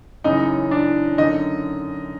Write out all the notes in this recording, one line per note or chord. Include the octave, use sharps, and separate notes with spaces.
F#2 C#3 E3 D#4 D#5
D4 D5
F#2 D3 D#4 D#5